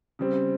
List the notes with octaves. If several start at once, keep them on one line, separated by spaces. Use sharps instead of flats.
C#3 G3 C4